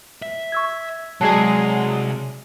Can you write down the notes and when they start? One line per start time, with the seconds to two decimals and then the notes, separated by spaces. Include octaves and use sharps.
0.22 E5
0.52 C#6 E6 G#6
1.21 C3 F#3 G#3 G#4 D5 A5 C7